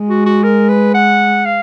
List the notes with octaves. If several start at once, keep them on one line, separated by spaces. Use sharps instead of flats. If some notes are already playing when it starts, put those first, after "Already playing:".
Already playing: G#3
F#4
F#4
A#4
B4
F#5
F5